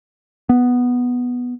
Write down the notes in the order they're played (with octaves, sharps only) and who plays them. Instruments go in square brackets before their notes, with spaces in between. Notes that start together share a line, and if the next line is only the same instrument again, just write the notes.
[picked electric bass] B3